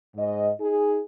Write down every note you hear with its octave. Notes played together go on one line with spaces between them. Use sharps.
G#2 D#5
D#4 G#4